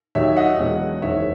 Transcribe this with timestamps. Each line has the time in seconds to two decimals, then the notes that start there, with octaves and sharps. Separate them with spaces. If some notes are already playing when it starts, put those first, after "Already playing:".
0.15 D#2 D#3 F#3 C#5 E5
0.36 D#5 F#5
0.59 E1 E2 B2 F#3 C#4
1.02 F#1 E2 D#3 F#3 C#5 E5